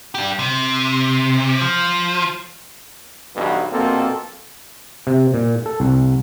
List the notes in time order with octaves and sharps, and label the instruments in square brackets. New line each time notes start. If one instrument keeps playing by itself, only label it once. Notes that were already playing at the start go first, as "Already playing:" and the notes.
[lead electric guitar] D4 G4
C3
F3
[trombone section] B1 E2 G2 B2
A#1 B2 A#3 C4 A4
[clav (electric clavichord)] C3
A#2
A4
C2